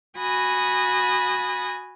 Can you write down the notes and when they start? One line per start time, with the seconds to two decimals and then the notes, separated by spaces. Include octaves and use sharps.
0.18 F#4 G#5 B5 D#6